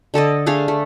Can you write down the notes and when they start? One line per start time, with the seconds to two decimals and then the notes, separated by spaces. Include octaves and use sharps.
0.14 D3 A4 D5 D#5
0.46 A3 D4 G#4 F5
0.68 A3